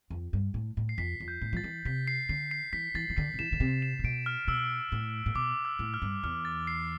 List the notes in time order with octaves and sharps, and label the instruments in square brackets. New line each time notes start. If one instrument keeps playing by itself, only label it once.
[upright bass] F2
G2
A2
A2
[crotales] C7
[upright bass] F2 [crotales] B6
[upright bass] F2
[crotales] G6
[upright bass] A2
[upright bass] F3 [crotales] A6
[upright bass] E3
[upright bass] C3 [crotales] B6
[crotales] C7
[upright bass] D3 [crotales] C7
[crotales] C7
[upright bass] E3 [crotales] B6
[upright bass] E3 [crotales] A6
[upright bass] E3
[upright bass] D3 [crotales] C7
[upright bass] D3
[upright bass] E3 [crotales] E7
[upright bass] D3
C3
[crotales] E7
[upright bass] C3
[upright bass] B2 [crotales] D7
[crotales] F6
[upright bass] B2 [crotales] E6
[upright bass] A2
A2
[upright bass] B2 [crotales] D6
[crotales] E6
[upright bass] A2
[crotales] F6
[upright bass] G2
[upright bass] E2 [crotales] F6
[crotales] A6
C7